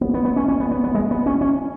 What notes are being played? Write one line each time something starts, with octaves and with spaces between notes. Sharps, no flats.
B3
B3
B3
C#4
C#4
B3
B3
B3
G#3
B3
C#4
C#4